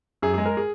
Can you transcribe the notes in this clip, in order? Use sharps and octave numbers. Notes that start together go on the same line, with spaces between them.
F#2 G#4
G#3 G#4
A#4
G#4